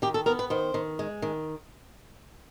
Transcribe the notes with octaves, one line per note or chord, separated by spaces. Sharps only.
D#3 G4
A4
B3 A#4
B4
D#3 C5
D#3
G#3
D#3